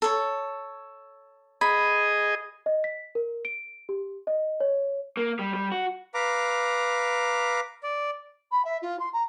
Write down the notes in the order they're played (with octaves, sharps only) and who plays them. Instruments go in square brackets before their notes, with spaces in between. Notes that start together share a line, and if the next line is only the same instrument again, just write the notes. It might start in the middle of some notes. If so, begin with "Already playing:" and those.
[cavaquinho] A4 C#5
[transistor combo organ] G#4 D#5 [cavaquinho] B5
[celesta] D#5
B6
A#4
D7
G4
D#5
C#5
[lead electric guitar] A#3
G3
G3
F#4
[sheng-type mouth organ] B4 F5 A#5 D6
D5
[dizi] B5
E5
F4
C6
A#5